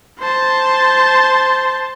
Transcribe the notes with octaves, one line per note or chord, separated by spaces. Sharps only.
C5 A5